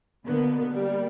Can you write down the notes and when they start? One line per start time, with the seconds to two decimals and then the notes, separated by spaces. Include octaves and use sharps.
0.25 B2 D3 A#3 B3
0.71 G3 A#3 D5